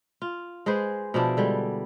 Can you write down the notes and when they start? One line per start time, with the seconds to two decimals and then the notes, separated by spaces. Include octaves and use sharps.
0.22 F4
0.66 G#3 G#4 B4 C5
1.14 B2 F3 D4 E4
1.37 D3 G3 G#3